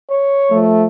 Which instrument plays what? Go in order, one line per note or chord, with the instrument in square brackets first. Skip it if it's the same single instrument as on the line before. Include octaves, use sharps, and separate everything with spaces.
[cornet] C#5
[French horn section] F3 A3